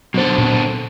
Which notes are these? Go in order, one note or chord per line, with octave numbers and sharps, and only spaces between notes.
B2 D3 F#3 A4 C5
A#2 C4